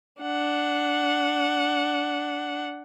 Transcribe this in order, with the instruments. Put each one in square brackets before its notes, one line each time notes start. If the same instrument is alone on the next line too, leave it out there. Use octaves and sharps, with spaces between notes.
[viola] D4 F#5